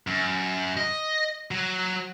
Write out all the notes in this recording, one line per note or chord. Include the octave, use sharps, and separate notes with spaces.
F#2
D#5
F#3